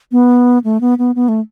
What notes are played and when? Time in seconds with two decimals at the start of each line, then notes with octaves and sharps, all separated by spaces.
0.12 B3
0.64 A3
0.81 B3
0.98 B3
1.15 B3
1.28 A3